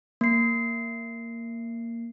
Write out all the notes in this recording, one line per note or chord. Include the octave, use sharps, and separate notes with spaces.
A#3 C7